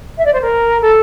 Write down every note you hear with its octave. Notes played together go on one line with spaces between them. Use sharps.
E5
D5
C5
A#4
A4